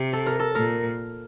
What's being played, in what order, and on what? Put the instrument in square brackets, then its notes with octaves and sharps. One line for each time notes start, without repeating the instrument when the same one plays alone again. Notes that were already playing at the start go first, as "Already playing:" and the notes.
Already playing: [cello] C3
[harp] A4
A#4
A4
[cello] A#2 [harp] A#4